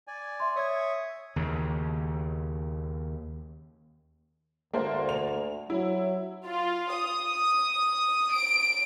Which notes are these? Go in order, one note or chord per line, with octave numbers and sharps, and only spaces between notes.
D5 G#5
E5 C6
C#5 E5 C#6 D#6 G#6
D#2 C#3
D2 A#3 D4 C5
F7
F#3 E4
F4
D#6
D7